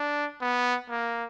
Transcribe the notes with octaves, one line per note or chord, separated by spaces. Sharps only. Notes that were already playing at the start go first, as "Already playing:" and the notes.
Already playing: D4
B3
A#3